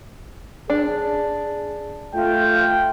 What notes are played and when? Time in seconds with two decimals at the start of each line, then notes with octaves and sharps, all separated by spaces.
0.70 D4 G#4
2.14 A3 F4 G5